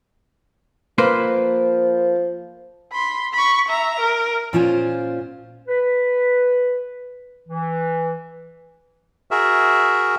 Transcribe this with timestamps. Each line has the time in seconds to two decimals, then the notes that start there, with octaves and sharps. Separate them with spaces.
0.98 F3 A#3 B4 C5
2.92 B5 C6
3.34 B5 C#6
3.68 E5 A#5
4.00 A#4
4.53 A#2 C#4 F4 C5 D5 G#5
5.68 B4
7.48 E3
9.31 F#4 G#4 A#4 E5